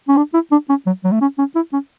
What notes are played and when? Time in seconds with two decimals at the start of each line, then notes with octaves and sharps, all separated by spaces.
0.08 C#4
0.17 D4
0.34 E4
0.51 D4
0.69 C#4
0.86 F#3
1.04 F#3
1.12 A3
1.21 C#4
1.38 C#4
1.55 E4
1.73 C#4